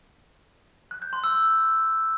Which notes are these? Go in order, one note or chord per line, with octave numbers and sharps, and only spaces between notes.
F#6
G6
C6
E6